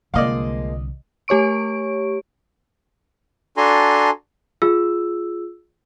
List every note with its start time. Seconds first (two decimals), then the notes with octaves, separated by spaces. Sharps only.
0.14 C2 D3 F3 G#3 A#3 D5 D#5 F5
1.28 A3 G4 C#5 C#6 D7
3.57 D4 F#4 A4 G#5 A#5 C6
4.62 F4 G#4 E6